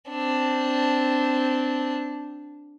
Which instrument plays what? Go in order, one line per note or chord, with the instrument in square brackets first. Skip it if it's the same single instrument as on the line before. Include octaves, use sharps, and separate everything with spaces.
[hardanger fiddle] C4 D4